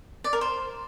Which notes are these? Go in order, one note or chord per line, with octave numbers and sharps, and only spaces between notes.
D5
A#4
C5